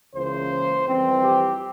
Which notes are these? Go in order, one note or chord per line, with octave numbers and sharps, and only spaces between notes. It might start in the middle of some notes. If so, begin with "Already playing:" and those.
C#2 C#3 E3 A#3 C5
F2 E3 G3 C4
G4